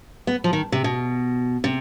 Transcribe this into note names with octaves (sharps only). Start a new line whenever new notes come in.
B3
F3
D#3
C3
B2
C3